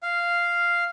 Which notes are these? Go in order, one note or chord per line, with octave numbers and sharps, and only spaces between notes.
F5